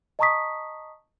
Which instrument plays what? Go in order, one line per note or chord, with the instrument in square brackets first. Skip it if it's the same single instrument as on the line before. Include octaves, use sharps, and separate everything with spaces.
[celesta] D#5 A5 A#5 C#6 D#6 B6